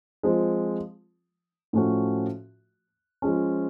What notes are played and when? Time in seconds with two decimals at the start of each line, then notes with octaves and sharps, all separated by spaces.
0.23 F3 G#3 C4
1.73 A2 F3 A3 C#4 F#4
3.22 F3 G#3 C#4